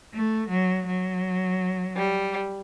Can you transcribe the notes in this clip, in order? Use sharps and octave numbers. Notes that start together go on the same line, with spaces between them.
A3
F#3
F#3
G3